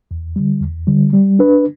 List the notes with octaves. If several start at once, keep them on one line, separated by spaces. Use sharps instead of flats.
E2
D3 G3
E2
D3 G3
G3
D4 B4